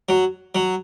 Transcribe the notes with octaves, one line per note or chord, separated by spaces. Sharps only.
F#3
F#3